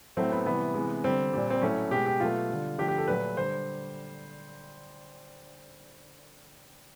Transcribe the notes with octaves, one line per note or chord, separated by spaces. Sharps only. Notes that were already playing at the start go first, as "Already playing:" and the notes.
A2 F#3 A3 C4
B3
C3 E3 G3 B3
C3 E3 G#3
D3 G3 C4
A#2 G3
C4
A2 F#3 A3 C#4
B2 G#3 G4
G4
B2 F#3 A3 F4
D3 G3
D3 F3 A3 G4
G4
A4
A#2 F#3 A3 B4
D3 G3 C5